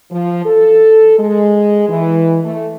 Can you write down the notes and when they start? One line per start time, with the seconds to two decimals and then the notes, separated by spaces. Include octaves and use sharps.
0.11 F3
0.45 A4
1.19 G#3
1.89 E3
2.44 A3